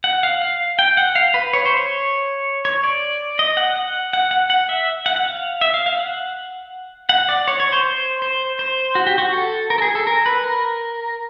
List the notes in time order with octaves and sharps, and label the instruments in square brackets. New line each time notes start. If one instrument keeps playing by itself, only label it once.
[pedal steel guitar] F#5
F5
F5
G5
F#5
F5
B4
C#5
C5
C#5
C#5
D5
D#5
F#5
F#5
F#5
F#5
F#5
E5
F#5
F#5
F5
E5
F5
F5
F#5
F#5
D5
C#5
C#5
C5
C5
C5
C5
F#4
G4
F#4
A4
A#4
A4
G#4
A4
A#4
B4
A#4